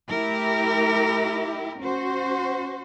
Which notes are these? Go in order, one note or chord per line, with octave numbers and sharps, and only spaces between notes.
A3 E4 G4 A#4
C#4 F#4 C5